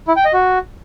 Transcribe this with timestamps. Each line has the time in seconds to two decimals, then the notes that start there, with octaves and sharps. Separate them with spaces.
0.08 E4
0.16 G5
0.25 D#5
0.33 F#4